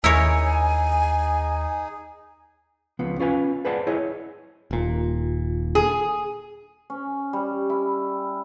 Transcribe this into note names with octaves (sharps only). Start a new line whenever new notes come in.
D#2 D#4 E4 G#4 A#4 C#5 G#5
C#2 F3 B3
C#4 F4 B4 G#5
G#4 B4 C5 D5 F#5 A5
E4 G#4 C#5 D#5
D#1 A#2
G#4
C#4
G3
E4